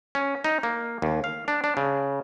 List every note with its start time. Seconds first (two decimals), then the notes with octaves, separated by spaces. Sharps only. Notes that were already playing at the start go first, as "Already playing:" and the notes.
0.15 C#4
0.44 D#4
0.63 A#3
1.02 D#2
1.24 F5
1.48 D4
1.64 D4
1.77 C#3